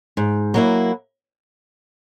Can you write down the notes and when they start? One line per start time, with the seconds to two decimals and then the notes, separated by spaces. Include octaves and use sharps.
0.17 G#2
0.54 F#3 A#3 E4